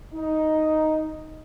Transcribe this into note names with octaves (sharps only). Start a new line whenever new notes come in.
D#4